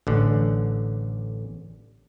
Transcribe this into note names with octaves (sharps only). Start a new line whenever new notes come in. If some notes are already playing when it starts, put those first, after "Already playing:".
A1 D3